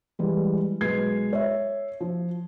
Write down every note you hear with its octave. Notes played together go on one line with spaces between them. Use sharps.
E3 G3 G#3
B1 G#3 B4 G#6 C7
C#5 E5
F3